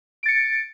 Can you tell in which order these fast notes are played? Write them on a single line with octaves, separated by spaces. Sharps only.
D7 A6 C#7